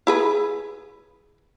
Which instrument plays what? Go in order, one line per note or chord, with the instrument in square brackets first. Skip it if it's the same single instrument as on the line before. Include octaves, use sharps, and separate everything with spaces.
[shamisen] E4 G#4 B4